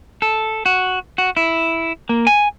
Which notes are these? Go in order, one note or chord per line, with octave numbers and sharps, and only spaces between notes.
A4
F#4
F#4
E4
A#3
G#5